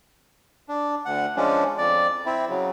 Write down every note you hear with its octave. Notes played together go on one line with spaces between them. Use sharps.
D4
D2 F#5
F3 G#3 C#4 D4
F2 D5
C4 E4
C#3 F#3